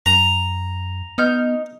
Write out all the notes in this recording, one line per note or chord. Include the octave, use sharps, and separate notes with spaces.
F#2 A#5
B3 D#4 F6 G6